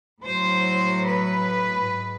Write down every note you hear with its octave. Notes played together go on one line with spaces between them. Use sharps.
A2 F#3 C5
B4
G#2